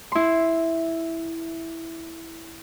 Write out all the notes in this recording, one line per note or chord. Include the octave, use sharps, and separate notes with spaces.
E4 C6